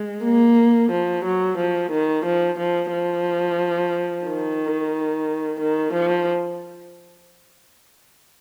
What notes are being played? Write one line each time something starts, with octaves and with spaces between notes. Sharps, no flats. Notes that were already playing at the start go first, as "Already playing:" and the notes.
Already playing: G#3
A#3
F3
F#3
F3
D#3
F3
F3
F3
D#3
D#3
F3